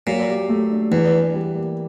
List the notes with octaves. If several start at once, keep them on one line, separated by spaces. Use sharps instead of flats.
A#2 F#3
G4
A3
D4
E2 E3
D4
G3
A#3